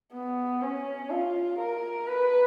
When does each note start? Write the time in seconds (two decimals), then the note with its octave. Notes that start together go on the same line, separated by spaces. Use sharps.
0.13 B3
0.62 C#4
1.10 F4
1.59 A#4
2.08 B4